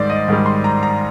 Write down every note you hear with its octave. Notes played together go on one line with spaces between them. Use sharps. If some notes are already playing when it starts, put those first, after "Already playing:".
Already playing: G#2 D#3 G3 C5 D5
D#5
G#2 D#3 G3
C6
A#5
A#5